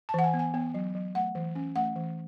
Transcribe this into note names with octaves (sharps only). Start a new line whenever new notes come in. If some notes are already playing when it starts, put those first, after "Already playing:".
A5
E3 F#5
G#5
B3
G#5
B3
F#3
F#3
A3 F#5
E3
C#4
A3 F#5
E3